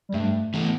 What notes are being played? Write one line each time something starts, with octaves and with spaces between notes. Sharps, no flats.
G3
G2 A3
E3 A3 B3